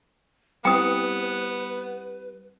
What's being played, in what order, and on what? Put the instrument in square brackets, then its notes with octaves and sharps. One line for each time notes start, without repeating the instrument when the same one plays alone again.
[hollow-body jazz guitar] G3 C4 E4 [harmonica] B3 [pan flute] B4 [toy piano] G5 D#6